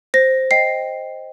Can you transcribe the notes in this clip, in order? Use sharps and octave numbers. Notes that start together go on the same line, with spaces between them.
C5 A#6
D#5 G5 C7